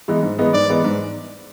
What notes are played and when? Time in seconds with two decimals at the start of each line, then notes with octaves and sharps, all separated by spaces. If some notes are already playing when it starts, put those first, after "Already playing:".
0.08 E3 G#3 B3 D#4
0.23 G#2
0.39 E3 G#3 B3 D#4
0.53 G#2 D5
0.69 E3 G#3 B3 D#4
0.84 G#2